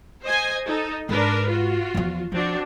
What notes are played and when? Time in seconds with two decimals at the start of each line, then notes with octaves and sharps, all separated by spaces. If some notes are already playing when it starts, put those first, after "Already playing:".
0.23 C5 D#5 G#5
0.65 D#4 A4
1.09 G#2 D4 A#4 B4
1.47 F4 F#4
1.95 E2 F3
2.32 F3 C4 D4 F#4